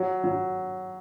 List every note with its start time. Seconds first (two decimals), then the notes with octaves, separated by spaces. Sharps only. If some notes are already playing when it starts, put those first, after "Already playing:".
Already playing: F#3
0.24 F#3